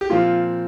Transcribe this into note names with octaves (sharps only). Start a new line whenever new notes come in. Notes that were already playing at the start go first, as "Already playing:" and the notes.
G4
A#2 F3 C4 F4